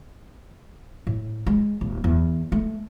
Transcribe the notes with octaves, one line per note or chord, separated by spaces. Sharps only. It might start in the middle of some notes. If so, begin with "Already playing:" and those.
A2
G#3
D#1
E2
A3